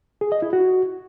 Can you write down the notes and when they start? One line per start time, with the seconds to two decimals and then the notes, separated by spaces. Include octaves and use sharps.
0.21 G#4
0.32 D#5
0.42 E4
0.53 F#4